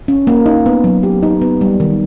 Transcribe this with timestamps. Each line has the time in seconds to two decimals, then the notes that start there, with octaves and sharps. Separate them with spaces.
0.08 C#4
0.27 A#3
0.46 D#4
0.66 B3
0.84 F#3
1.03 G4
1.23 D#4
1.42 B3
1.61 G3
1.80 D#3